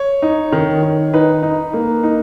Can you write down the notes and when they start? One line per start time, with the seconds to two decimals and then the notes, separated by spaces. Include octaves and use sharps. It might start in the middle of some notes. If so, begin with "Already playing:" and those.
Already playing: C#5
0.22 D#4
0.52 D#3
0.83 D#3
1.13 D#4 B4
1.43 D#4
1.74 A#3
2.03 D#4